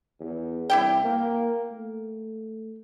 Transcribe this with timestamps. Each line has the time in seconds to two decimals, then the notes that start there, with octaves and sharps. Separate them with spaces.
0.20 E2
0.70 C2 E4 G4 G5
1.04 A#3
1.71 A3